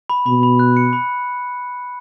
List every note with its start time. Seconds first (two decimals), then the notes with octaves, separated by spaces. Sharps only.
0.10 B5
0.26 B2 B5
0.43 B5
0.59 F#6
0.77 C#7
0.93 B5